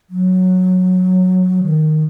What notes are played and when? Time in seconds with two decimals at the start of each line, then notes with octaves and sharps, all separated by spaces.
0.10 F#3
1.63 D#3